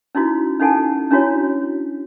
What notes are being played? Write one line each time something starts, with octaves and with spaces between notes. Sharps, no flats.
C#4 D#4 E4 F#4
C#4 D#4 A4 F#5 G#5 A5
C#4 D4 E4 F#4 C#5